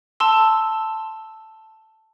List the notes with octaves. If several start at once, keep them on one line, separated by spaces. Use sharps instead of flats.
A5 C6 E6